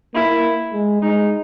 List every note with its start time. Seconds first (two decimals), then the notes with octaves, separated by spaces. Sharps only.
0.14 A#3 E4
0.73 G#3
1.02 G#3 D#4